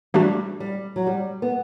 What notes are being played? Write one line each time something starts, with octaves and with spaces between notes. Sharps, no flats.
E3 G3 A3 D4 F#4
G3
F#3
G3
B3